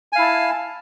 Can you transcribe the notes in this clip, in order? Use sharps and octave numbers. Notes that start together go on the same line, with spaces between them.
E4 F5 G#5 A5